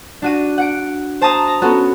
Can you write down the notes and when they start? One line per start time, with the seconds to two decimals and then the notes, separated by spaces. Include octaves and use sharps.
0.22 D4 F#4 D#7
0.58 F#5 C#7 D7
1.21 C5 A5 A#5 D#6
1.47 A#5
1.62 B3 C#4 F#4 A4